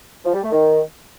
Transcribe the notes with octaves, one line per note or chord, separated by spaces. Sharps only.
F3
G3
A3
D#3